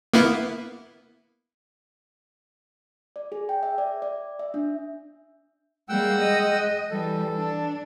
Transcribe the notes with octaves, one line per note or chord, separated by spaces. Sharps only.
A#3 B3 E4
D5
G#4
G5
E5
D5
D5
E5
D4
G3 G#3 A#3 F#5 G5 E6
D#5
E3 G3 A4
D4